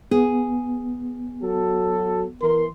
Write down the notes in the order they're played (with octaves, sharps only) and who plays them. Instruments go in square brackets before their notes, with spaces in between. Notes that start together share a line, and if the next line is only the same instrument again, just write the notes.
[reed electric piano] B3 [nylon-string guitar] G#4
[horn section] F#3 F#4 A4
[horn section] E3 C6 [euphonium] A#4